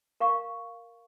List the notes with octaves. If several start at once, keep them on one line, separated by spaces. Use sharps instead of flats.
A#4 F5 C#6